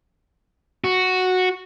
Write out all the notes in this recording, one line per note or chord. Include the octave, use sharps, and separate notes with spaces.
F#4